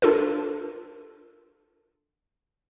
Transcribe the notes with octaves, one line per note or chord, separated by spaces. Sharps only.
D4 F4 A4 A#4